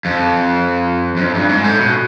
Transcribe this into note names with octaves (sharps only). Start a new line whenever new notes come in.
F2
F#2
F2
G2
G#2
A2
B2